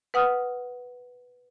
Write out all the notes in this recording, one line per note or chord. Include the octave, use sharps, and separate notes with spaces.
B4 F#5 D#6 F6